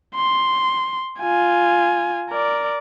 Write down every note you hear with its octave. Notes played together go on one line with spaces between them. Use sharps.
C6
F4 G#5
A#4 D5